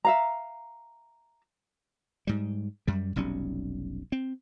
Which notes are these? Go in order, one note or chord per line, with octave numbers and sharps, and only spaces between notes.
E5 F5 A#5
G#2 G3
F#2 G3
F1 B1 G3 C#4
C4